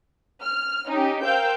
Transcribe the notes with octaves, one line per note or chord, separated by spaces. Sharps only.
F6
C#4 D#4 G4
A#4 C5 F5 G5 E6 G6